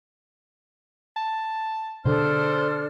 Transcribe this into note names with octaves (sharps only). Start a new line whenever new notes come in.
A5
B2 D3 D4 A4 C5 F6